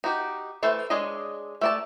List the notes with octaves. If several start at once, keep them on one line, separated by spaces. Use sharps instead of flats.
D#4 F#4 G4
E3 A3 A4 C5
G#3 D4 G#4 C#5 D#5
A3 D5 A5